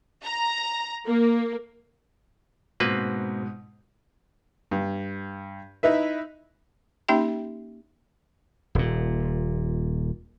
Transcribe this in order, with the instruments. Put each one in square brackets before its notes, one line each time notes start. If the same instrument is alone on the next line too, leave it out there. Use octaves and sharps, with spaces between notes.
[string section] A#5
A#3
[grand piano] G#2 B2 [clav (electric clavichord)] A#3 C4 B4
[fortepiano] G2
D#4 E4 B4 E5
[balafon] A#3 C#4 D#4 G4 E5 G5
[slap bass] D#1 A#2